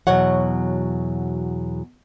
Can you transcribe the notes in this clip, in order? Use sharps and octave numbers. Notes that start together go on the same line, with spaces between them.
E2 B2 F#3 C#5 F#5